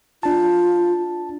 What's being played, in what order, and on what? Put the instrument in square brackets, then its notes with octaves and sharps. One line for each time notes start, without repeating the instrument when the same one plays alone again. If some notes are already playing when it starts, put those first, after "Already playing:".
[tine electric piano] D4 A5 [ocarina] F4